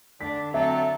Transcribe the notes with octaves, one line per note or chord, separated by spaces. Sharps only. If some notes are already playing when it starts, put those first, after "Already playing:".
D3 D4 B6
F#3 C4 A4 E5